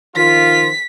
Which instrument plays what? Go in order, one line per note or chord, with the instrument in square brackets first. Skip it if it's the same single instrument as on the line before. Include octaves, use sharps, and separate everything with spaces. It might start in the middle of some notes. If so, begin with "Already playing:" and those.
[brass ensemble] D#3 F3 F4 [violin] B6